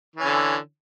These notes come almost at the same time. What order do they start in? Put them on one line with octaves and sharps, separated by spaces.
E3 C#4 D3